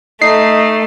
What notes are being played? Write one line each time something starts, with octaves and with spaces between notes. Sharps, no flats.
A3 D#4 C7